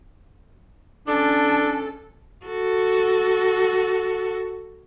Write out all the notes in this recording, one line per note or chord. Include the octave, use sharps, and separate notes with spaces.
C#4 D4 A4
F#4 A4